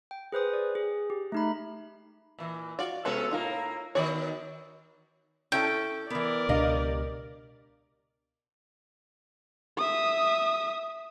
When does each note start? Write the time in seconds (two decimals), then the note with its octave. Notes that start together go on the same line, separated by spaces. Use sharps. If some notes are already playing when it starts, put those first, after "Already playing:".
0.11 G5
0.32 G#4 B4 C5 D#6
0.53 D5
0.75 G#4
1.10 G4
1.32 A3 D#4 B5
2.39 A#2 E3
2.79 F4 F#4 D5
3.05 C3 G#3 B3 C#4 F#4 A4
3.31 A2 A#3 D#4 F4 A#4
3.95 D#3 B3 F#4 C#5 D5
5.52 C#4 E4 A4 G5
6.10 E3 B3 A#4 D5
6.49 C#2 B2 D4 G4 D#5 F5
9.77 E5 D#6